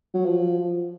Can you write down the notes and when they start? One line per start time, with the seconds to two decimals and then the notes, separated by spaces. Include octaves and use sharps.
0.14 F#3
0.25 F3